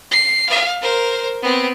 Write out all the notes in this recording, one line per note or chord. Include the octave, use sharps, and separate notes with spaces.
C7
F5
A#4 C5
B3 C4